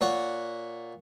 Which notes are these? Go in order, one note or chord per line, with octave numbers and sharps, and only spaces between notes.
A#2 C#5 F#5